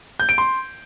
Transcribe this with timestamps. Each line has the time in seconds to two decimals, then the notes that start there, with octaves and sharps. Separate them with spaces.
0.20 G6
0.29 D7
0.38 C6